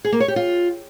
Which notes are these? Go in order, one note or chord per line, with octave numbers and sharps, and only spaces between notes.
G#4
A#3
C#5
G4
F4